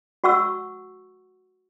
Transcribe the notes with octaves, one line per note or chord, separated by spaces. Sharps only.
F#4 F#5 C#6 E6